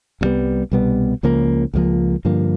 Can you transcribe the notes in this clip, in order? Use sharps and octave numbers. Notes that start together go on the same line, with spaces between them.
C2 B2 G3 B3
C2 B2 G3 B3
C#2 C#3 F3 A#3
C#2 C#3 F3 A#3
G2 D3 F3 A#3